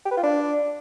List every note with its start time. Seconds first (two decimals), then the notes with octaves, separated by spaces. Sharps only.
0.05 G4
0.11 B4
0.17 F4
0.23 D4